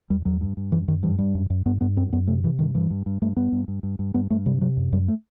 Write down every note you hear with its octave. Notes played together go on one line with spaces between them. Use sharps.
E2 G3
E2 F#3
G2
G2
F#2 E3
F#2 D#3
G2 E3
G2 G3
F#2
F#2
G2 B3
G2 B3
F#2 C4
F#2 B3
C3 A3
C3 E3
G2 D#3
G2 E3
G2
G2
G2 A3
G2 B3
G2
G2
G2
G2
G2 B3
G2 A3
C3 G3
C3 F#3
F#2
F#2 G3
A3